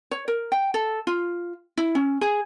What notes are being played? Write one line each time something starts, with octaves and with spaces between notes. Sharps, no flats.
C#5
A#4
G5
A4
F4
E4
C#4
G#4